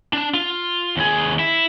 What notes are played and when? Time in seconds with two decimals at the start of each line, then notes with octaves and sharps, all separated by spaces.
0.13 D4 A5
0.34 F4
0.97 D#2 G#4
1.39 E4